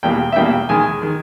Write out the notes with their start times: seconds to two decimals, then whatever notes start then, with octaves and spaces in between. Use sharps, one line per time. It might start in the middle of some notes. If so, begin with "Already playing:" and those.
0.03 E2 B2 G3 A#3 G5
0.32 E5
0.36 E2 B2 G3 A#3 G5
0.69 D#2 D#3 G#3 G#5
1.02 D#3 G#3